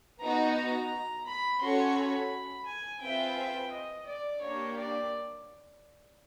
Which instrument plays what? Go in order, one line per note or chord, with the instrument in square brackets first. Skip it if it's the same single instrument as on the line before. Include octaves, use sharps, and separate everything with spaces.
[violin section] B3 D#4 F#4 [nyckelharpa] A#5
[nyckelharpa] A#5
B5
[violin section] C#4 F#4 A4 C#5 [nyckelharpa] C6
[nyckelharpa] B5
G#5
[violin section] C4 F4 G#4 B4 E5 [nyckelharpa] G5
[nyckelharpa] D#5
D5
[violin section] A#3 D4 G4 [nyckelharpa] C#5
[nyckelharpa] D5